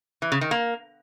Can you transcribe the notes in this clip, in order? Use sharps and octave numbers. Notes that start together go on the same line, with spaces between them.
E3
C#3
D#3
A#3